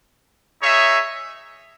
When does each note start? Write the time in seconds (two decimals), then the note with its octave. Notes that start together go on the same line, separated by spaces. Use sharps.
0.62 D#4 G#4 C#5 E5